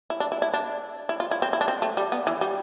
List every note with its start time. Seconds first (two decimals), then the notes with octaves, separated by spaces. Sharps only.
0.10 E4
0.20 D4
0.32 E4
0.42 E4
0.54 D4
1.09 E4
1.20 F4
1.31 E4
1.42 C4
1.53 E4
1.61 D4
1.68 C4
1.82 A3
1.97 G3
2.12 B3
2.27 E3
2.41 G3